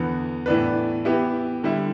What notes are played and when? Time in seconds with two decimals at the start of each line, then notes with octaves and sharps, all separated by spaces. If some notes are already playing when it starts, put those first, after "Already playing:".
Already playing: E2 D3 B3
0.46 A2 E3 B3 D4 B4
1.05 E3 B3 E4 G4
1.63 D3 G3 E4